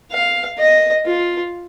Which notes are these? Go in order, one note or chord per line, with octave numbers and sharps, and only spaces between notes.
F5
D#5
F4